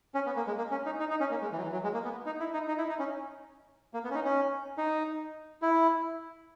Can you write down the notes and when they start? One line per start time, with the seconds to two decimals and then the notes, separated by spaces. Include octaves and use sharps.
0.15 C#4
0.26 B3
0.36 A#3
0.47 G#3
0.58 A#3
0.71 C#4
0.86 D#4
1.00 D#4
1.10 D#4
1.20 C#4
1.31 A#3
1.41 G#3
1.52 E3
1.58 F#3
1.63 E3
1.73 F#3
1.84 G#3
1.94 A#3
2.04 B3
2.26 D#4
2.40 E4
2.53 D#4
2.68 D#4
2.78 E4
2.89 D#4
2.99 C#4
3.94 A#3
4.04 B3
4.11 C#4
4.15 D#4
4.25 C#4
4.78 D#4
5.62 E4